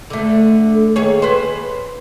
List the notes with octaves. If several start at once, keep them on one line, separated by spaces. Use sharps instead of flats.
D3 A3
D#2 G#4 C#5
B4 C5